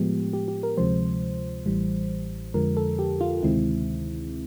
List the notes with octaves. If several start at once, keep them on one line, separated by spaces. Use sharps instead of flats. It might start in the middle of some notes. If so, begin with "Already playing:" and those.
Already playing: A2 F3 G#3 B3 G4
G4
G4
A#4
D2 C3 F3 G#3 C5
A1 A2 E3 G3
F2 D3 F3 G#3 A#4
A4
G4
F4
D2 C3 D#3 G#3 C4 E4